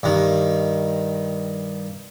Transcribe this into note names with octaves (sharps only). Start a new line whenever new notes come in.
G2 D#3